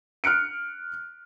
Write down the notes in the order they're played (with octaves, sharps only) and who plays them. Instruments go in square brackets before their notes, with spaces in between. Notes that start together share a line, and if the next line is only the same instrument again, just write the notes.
[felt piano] F6 F#6 C#7 D7